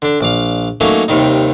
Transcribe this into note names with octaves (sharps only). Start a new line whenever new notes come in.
D3 D4
A#1 D5 F5
F#3 A3 A#3 C#4 D#4
D#2 C3 D#3 G3 D#4